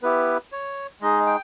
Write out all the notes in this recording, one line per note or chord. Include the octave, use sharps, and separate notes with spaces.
B3 E4 G4 B4
C#5
G#3 D#4 G#4 D#5
G5